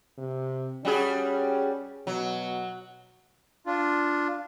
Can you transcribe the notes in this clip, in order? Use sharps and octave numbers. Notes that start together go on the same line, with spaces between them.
C3
G3 C#4 F#4 G#4
B2 F#3
D4 F4